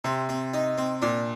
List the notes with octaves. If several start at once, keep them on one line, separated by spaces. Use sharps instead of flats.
C3 C4
C4
D#4
C4
A#2 D4